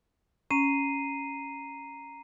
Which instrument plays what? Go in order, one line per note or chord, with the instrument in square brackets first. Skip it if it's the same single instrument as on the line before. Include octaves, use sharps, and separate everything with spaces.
[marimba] C#4 [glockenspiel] A#5 C7 D#7